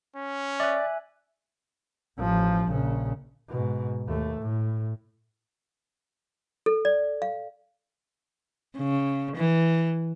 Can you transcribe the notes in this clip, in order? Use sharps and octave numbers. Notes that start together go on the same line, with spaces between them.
C#4
D5 E5 G#5 F#6
A1 F3
A#1 C#3
G#2 B2
D#2 A3
A2
A4
D5
F5
C#3
E3